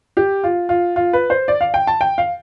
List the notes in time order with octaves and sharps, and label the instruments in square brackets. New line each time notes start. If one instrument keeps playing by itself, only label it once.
[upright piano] G4
F4
F4
F4
B4
C5
D5
F5
G5
A5
G5
F5